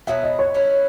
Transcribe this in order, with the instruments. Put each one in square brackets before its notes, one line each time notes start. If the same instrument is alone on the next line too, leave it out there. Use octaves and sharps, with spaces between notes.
[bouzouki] B2 F#3 B3 [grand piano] E5
[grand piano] D#5
C#5
[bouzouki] F#3 C#4 E4